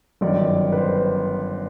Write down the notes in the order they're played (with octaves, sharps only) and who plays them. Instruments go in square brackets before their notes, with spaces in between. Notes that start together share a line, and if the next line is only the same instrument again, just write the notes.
[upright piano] G1 F#2 D#3 D5
B4
C5